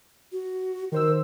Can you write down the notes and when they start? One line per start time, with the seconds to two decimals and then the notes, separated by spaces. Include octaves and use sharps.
0.32 F#4
0.92 D#3 A#4 C5 E6